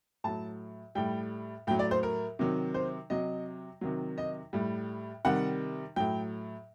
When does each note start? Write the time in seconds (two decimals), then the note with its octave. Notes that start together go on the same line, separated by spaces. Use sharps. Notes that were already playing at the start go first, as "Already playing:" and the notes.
0.24 A2 F#3 A5
0.95 A2 G3 G5
1.67 A2 G5
1.71 F#3
1.79 D5
1.91 C5
2.03 A#4
2.39 C3 D#3 F#3
2.74 C5
3.10 C3 F#3 D#5
3.81 C3 D#3 F#3
4.18 D#5
4.53 A2 G3
5.25 C3 D#3 G3 F#5
5.96 A2 F#3 G5